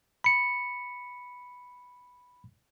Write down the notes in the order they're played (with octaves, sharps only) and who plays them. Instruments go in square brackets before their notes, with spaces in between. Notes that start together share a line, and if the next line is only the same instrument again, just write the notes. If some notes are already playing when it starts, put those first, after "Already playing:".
[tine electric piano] B5 C#7